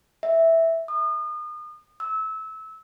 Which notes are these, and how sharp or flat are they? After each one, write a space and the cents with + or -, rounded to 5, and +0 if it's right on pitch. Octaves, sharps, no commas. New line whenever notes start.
E5 -5
D#6 -35
E6 -25